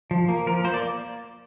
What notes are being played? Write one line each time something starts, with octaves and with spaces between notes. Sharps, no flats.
F3
A#3
F3 A#4
A#3 C5
D5